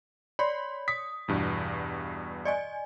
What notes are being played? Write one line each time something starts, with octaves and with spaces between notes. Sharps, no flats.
C#5 D5 B5 C6
D#6 B6
E2 G2 B2
D5 D#5 G#5